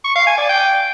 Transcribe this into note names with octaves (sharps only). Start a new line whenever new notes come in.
C#6
F5
G#5
D5
G5